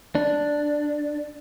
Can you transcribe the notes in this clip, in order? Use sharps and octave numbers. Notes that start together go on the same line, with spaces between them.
D4